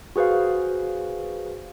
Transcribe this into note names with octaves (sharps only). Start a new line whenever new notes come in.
F#4 G#4 B4 C5 F5